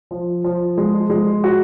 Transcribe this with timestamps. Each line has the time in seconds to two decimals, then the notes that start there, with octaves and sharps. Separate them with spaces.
0.11 F3
0.44 F3
0.77 G#3
1.10 G#3
1.44 F#4